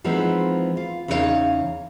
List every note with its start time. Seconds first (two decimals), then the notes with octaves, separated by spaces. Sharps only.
0.04 E3 F3 G#3 B3 C4 D#4
0.77 F4
1.08 E2 C#3 D#4 F4 C#5 F5